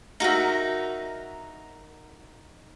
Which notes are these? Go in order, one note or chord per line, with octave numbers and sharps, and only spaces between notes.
D#4 F#4 A#4 E5